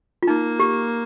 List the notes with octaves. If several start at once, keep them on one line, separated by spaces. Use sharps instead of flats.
F4
A#3 D#4
G4